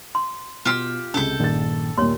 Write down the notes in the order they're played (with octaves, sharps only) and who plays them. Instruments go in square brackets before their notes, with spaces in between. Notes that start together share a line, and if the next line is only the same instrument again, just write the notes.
[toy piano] C6
[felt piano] B2 [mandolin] F4 G4 E6
[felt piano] C#2 C3 [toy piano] C#4 [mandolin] A4 G6
[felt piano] A#1 A6 [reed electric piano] G2 D#3
[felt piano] D#2 A#2 [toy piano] C#5 C6